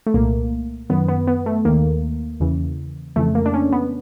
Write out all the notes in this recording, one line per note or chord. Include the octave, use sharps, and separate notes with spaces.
A3
C2 A#2 A#3
F#2 D#3 B3
B3
B3
A3
D#2 D#3 A#3
E2 C#3 E3
F2 C#3 E3 A3
A#3
D4
C#4
B3